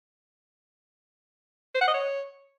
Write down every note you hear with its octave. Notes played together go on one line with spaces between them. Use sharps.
C5
F#5
D#5
C#5